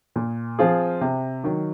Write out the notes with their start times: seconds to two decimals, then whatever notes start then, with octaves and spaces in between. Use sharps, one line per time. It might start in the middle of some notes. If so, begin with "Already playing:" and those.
0.16 A#2
0.59 F3 C4 F4 G#4
1.01 C3
1.44 D#3 F#3